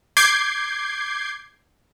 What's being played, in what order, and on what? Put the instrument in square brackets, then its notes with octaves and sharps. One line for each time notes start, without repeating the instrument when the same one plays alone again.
[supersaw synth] D6 G6 G#6 C7